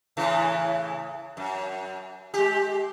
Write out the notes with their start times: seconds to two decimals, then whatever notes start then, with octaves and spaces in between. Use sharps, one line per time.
0.17 A2 C#3 E3
1.37 F#2
2.34 G#3 G4